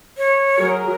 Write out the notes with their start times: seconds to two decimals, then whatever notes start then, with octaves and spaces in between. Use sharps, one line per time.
0.18 C#5
0.57 F#3 G#4 A#4